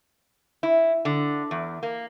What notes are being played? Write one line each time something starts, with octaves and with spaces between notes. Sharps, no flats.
E4
D3
E2
A#3